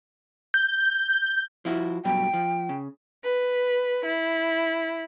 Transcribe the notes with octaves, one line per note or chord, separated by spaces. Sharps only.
G6
F3 E4 F#4
G2 B2 F#3 G5
F3
C#3
B4
E4